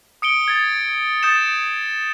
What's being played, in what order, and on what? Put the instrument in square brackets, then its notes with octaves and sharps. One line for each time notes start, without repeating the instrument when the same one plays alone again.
[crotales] D#6 C#7 D7 G7
G#6 A6
D#6 G6 A6 C#7 E7